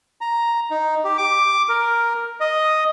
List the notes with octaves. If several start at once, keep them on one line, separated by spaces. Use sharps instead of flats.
A#5
D#4
G4
D6
A#4
D#5